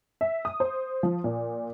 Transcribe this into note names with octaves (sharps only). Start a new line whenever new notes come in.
E5
D#6
C5
F3
A#2